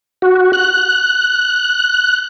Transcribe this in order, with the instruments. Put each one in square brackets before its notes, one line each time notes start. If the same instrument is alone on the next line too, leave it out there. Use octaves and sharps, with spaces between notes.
[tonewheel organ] F#4
F#6